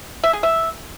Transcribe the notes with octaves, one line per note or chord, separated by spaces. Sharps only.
E5
G#4
E5